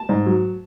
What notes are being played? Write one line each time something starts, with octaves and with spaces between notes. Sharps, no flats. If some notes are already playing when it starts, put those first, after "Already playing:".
Already playing: A5
G#2
F#3